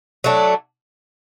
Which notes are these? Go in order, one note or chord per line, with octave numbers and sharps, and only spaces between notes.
F#3 A3 D4